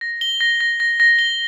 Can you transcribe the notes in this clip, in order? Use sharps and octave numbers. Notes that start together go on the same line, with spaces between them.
A#6
G7
A#6
A#6
A#6
A#6
G7